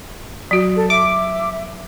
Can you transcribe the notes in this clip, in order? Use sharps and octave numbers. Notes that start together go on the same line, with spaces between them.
F#3 F#4
A4
E5 D6